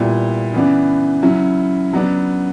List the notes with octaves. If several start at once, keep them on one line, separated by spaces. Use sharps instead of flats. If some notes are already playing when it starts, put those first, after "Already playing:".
Already playing: A#2 G3 B3 E4
C#3 E3 B3 D4
C#3 F#3 C#4 E4
C#3 F#3 B3 D4